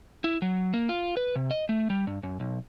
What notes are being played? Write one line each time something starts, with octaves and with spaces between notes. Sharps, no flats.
E4
F#3
A#3
F4
B4
C3
D#5
A3
G3
G2
F#2
B1